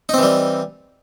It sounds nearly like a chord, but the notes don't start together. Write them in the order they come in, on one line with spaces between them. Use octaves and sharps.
D#4 C4 E3 G3